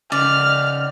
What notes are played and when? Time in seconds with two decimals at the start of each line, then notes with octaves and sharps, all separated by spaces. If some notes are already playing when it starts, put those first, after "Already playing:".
0.12 C#3 D#4 D5 F6